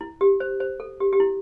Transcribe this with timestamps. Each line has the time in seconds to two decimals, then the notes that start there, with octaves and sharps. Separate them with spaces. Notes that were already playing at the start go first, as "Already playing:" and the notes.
0.01 E4
0.21 G4
0.40 C5
0.60 C5
0.80 A4
1.00 G4
1.13 G4
1.20 E4